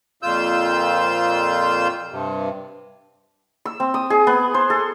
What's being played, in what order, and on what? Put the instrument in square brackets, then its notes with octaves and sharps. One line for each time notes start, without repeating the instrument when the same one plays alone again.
[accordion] F2 A#2 F4 E6 G6
G2 C3
[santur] E6
C4
D#6
G#4
B3
C5
A4